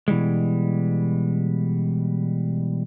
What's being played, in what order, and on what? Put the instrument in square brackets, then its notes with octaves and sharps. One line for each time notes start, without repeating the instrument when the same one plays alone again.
[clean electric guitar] B2 E3 G3 G#3